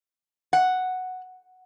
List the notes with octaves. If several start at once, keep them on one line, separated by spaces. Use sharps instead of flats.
F#5